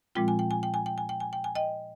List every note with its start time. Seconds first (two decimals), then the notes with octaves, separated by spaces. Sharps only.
0.15 A#2 F3 G#3 C4 F4 G5
0.28 G#5
0.39 G5
0.51 G#5
0.63 G5
0.74 G#5
0.86 G5
0.98 G#5
1.09 G5
1.20 G#5
1.33 G5
1.44 G#5
1.55 D#5 G5